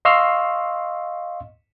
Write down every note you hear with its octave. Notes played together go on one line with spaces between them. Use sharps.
D#5 F5 C6 C#6 E6 F6